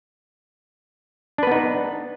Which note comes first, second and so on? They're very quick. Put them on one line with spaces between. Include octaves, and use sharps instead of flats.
D4 B4 B3 D#4